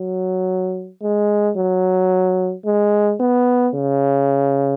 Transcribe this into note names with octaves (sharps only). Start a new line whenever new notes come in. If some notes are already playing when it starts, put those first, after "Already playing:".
Already playing: F#3
G#3
F#3
G#3
B3
C#3